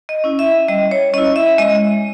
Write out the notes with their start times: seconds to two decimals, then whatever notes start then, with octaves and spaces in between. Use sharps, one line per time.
0.09 D#5
0.24 C#4 E4
0.39 E5
0.68 G3 D#5
0.91 C#5
1.14 C#4 E4 D#5
1.36 E5
1.58 G#3 D#5